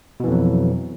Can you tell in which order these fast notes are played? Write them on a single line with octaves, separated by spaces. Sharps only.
B2 E3 F2 F#3